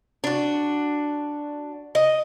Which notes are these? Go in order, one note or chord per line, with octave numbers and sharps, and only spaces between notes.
D4 F#4
D#5